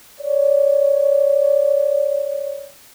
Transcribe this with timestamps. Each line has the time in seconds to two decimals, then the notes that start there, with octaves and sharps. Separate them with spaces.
0.20 C#5 D5